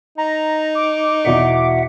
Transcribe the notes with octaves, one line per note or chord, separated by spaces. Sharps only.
D#4 A#5
D6
E2 B2 D5 E5 F#5